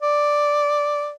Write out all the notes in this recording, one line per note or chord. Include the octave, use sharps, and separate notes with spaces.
D5